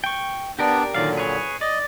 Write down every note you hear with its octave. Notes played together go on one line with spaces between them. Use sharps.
G5 C#6
B3 D4 G4 A#4 D5
A#2 D3 D#3 F#3 D5 F5
G#4 B4 C#5
D5 D#5